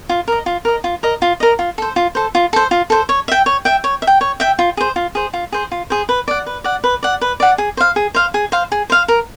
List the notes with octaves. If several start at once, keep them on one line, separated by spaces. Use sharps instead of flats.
F4
A#4 D#5
F4
A#4 D#5
F4
A#4 D#5
F4
A#4 D#5
F4
A4 C5
F4
A4 C5
F4
A4 C5
F4
A4 C5
C#5
E5 G5
C#5
E5 G5
C#5
E5
G5
C#5
E5 G5
F4
G#4 C5
F4
G#4 C5
F4
G#4 C5
F4
G#4 C5
B4
D5 F#5
B4
D5 F#5
B4
D5 F#5
B4
D5 F#5
G#4
C5 F5
G#4
C5 F5
G#4
C5 F5
G#4
C5 F5
A#4